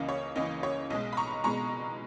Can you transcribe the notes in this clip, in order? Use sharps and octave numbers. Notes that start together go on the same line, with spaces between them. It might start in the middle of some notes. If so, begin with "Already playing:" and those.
Already playing: C#2 C#3 E3 A#3 C#4 D#5
C#5
C#2 C#3 E3 A#3 C#4 D#5
C#5
B1 B2 G#3 D#5
B5
A#5 C#6
B2 G#3 A#5 C#6